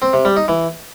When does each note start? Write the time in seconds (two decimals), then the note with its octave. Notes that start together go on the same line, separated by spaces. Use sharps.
0.02 C4
0.13 C3
0.25 G3
0.37 D#4
0.48 E3